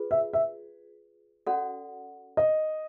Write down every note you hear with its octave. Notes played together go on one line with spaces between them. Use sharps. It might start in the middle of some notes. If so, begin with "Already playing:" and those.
Already playing: F4 G#4 B4
E5
E5
C#4 F#4 A4 D5 F#5
D#5